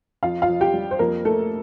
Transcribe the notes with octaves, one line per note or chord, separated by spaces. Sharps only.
F2 F4 F5
F4 F5
F2
G4 G5
G3
C5
F2 A#3 A#4
A3 A4